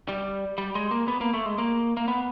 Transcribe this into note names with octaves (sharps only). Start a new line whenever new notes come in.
G3
G3
G#3
A#3
B3
A#3
A3
G#3
A#3
A#3
B3